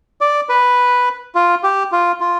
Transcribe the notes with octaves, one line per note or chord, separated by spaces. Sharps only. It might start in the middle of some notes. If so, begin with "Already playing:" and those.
D5
B4
F4
G4
F4
F4